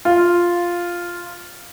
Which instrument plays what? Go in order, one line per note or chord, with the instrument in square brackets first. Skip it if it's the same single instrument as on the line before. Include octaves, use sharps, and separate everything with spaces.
[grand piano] F4